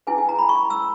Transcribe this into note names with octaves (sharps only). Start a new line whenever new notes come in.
C#4 E4 G#4 B4 G#5
G#5
A#5
B5
C#6
E6